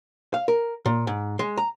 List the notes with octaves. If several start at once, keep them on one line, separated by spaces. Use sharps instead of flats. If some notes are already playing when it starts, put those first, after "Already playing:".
F5
A#4
A#2
G#2
G#3
A#5